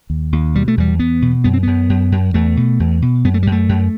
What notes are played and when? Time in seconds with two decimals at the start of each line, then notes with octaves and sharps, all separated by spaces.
0.10 D#2
0.32 D#2
0.55 B2 G3
0.68 A3
0.77 E2 G3
0.99 E2 B3
1.22 B2
1.44 F#2 B3
1.53 C4
1.63 F#2 B3
1.89 F#2
2.12 F#2
2.34 E2 A3
2.57 B2
2.80 E2
3.02 B2
3.24 F#2 B3
3.34 A3
3.43 F#2 G3
3.52 A3
3.69 F#2